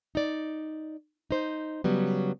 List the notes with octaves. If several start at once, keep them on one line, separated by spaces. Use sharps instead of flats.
D#4 D5
D#4 C5
C#3 F#3 G3 B3